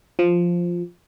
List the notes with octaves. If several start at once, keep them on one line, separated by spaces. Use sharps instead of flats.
F3